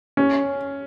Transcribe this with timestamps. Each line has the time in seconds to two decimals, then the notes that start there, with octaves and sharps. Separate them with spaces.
0.17 C#4